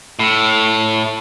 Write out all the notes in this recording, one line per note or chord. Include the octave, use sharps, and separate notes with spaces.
A2